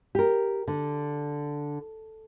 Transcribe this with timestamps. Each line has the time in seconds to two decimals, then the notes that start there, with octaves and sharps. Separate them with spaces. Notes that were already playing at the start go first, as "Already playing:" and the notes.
0.15 G4 A#4
0.68 D3